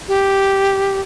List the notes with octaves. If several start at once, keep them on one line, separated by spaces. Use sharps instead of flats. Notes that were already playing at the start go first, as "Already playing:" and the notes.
G4